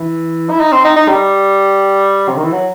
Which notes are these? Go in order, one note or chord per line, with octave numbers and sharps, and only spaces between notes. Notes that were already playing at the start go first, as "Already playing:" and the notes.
Already playing: E3
E4
D#4
C4
D#4
D#4
G3
C3
D#3
E3
F#3